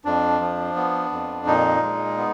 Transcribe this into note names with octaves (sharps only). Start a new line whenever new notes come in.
F2 D4
F3
B3
F2
A#2 D#4
G#3
B3